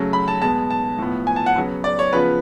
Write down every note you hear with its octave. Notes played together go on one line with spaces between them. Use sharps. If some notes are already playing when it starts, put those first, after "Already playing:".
Already playing: C#3 F#3 A3
B5
A5
B2 G#3 B3 A5
A5
A2 F3 B3
G#5
A5
F#5
C#3 F#3 B3
D5
C#5
C#3 F3 B3 B4